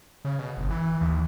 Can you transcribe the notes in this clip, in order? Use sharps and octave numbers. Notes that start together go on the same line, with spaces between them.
C#3
B2
G1
E3
D#2